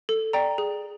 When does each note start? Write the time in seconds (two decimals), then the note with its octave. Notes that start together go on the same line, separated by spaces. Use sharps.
0.09 A4
0.33 D5 G5 A#5
0.58 G#4